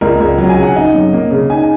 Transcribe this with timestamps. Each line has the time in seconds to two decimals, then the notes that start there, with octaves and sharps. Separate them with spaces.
0.01 C#2 A#4
0.20 C#2
0.38 F#3
0.49 G#5
0.57 C#3
0.63 F#5
0.76 D#4 D#5
0.94 F#2
1.13 A#3
1.31 C#3
1.50 D#4 G#5